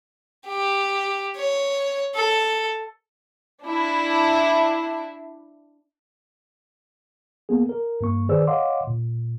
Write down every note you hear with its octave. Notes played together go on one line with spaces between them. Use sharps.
G4
C#5
A4
D4 E4
A#3 B3 G#4
A#4
G2 A#3 C#6
D#3 G#4 B4 C5 D5 E6
C#5 D#5 F5 F#5 C6 D6
A#2